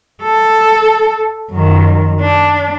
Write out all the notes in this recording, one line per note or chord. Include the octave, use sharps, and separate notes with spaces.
A4
F#2 D#3
D4